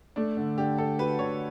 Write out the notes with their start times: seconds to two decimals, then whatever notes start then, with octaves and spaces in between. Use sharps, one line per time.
0.16 A3 D4
0.37 D3
0.57 D3 G4
0.78 D3 A4
0.99 F#4 B4
1.19 D3 C#5